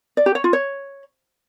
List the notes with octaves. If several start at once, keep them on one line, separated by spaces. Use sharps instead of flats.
D5
G4
C#5
F4
C#5